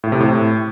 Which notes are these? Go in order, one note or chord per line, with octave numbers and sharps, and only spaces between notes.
A2
C3
A2